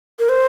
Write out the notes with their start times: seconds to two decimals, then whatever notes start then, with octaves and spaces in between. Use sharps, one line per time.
0.19 A#4
0.29 C5